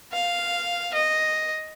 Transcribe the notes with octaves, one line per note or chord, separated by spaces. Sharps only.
F5
D#5